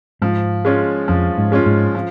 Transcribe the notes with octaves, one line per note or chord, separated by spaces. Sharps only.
G#2 F3
G#3 C#4 F4
F2 F3
G#2
G#3 C#4 F4
G#2
F3